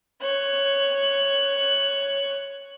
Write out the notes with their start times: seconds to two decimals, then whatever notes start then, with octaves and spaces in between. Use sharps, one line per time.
0.21 C#5 F#6